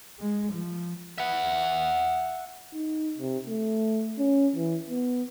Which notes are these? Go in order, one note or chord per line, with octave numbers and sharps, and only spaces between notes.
G#3
F3
E5 F#5
D#4
C3
A3
C#4
E3
B3